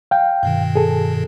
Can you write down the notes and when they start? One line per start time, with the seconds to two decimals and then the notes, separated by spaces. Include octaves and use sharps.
0.11 F5 G5
0.43 G2 B2 D#3
0.76 G#4 A4